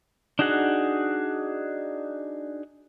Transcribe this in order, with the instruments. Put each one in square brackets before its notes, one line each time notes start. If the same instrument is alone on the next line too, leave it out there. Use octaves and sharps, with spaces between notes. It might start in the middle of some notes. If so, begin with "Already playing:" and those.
[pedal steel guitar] D4 D#4 F#4 G#4 F#5